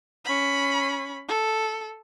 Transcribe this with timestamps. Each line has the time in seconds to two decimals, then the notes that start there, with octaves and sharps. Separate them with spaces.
0.25 C#4 B5
1.29 A4